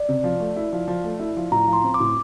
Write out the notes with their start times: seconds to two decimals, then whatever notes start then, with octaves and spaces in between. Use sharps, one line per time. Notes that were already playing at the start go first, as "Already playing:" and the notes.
Already playing: D5
0.09 C3
0.24 F3
0.40 A3
0.56 E4
0.72 F3
0.88 F3
1.04 A3
1.20 E4
1.36 F3
1.51 A2 A#5
1.67 F3
1.73 C6
1.83 C4
1.94 D6
2.00 A2